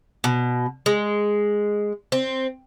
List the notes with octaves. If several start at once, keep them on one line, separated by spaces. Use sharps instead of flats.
B2
G#3
C4